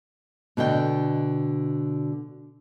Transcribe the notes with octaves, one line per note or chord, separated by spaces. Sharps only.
B2 D3 D#5 G5